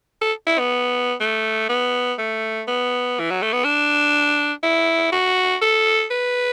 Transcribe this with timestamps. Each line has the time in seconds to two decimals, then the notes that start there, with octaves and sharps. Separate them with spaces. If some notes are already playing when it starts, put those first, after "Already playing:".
0.21 A4
0.47 E4
0.59 B3
1.21 A3
1.69 B3
2.19 A3
2.68 B3
3.20 E3
3.31 F#3
3.42 A3
3.53 B3
3.64 D4
4.64 E4
5.12 F#4
5.62 A4
6.11 B4